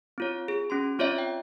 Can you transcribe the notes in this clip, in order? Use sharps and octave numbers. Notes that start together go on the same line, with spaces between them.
C4 F4 C#5
G#4
C#4 F#4 C6
C4 F4 C#5 D5 E5
G5